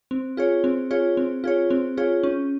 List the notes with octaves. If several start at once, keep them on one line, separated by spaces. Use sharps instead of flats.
C4
F4 G#4 C#5
C4
F4 G#4 C#5
C4
F4 G#4 C#5
C4
F4 G#4 C#5
C#4